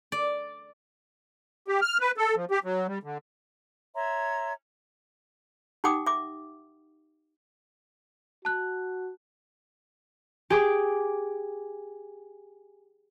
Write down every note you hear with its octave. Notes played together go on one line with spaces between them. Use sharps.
D5
G4
F6
B4
A4
F3
G4
F#3
G3
D3
C#5 E5 A#5 C6
D#4 G4 F#5 G5 D6 D#6
E5 D6
F#4 A5 F#6
G4 G#4 D6